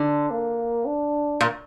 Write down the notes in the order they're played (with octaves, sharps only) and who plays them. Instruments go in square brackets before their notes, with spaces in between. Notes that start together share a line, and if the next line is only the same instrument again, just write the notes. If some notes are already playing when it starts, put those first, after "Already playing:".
Already playing: [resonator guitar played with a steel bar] D3 [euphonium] D4
[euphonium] A#3
D4
[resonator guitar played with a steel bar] A#2